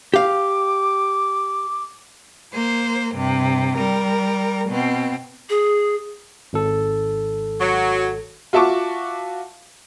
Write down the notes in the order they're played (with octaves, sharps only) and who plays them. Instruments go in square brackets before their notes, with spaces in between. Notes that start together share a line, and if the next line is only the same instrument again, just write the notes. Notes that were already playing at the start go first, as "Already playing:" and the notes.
[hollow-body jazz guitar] G4 F5 [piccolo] D6
[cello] A#3 C5
G2 C3
G3 A#4
B2 C4
[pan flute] G#4
[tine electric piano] G#1 A4
[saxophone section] F#3
[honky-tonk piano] F4 F#4 E5 A5 C#6 D6